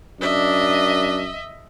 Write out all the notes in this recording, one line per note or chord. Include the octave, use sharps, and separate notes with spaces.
F#2 D4 D#5 E5